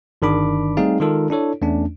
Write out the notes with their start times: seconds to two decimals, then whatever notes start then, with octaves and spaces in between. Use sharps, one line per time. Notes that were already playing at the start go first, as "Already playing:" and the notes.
0.22 G1 D#3 D4 B5 D6
0.77 G3 A3 C4 D#4 G#4 F5
1.00 D#3 G#3 D#4 F4 A4 A#4
1.30 D4 E4 A4 C#5
1.62 E2 A3 C#4 D4